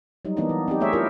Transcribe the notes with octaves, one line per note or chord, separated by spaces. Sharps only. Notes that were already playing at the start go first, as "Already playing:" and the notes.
F#3 G3 D#4
E3 A#3 B3 D4 D#4
E3
C4 D#4 G4
A3 A#3 G#4 C#5 E5
E4 F4 G4 A#4